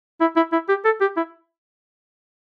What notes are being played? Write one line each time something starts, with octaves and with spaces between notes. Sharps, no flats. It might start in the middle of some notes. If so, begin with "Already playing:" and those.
E4
E4
E4
G4
A4
G4
E4